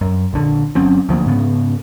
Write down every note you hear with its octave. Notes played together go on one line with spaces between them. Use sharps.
F#2
A#1 D3
G1 F#3 C4 C#4
D2 F3 A#3
G#2 C#3 B3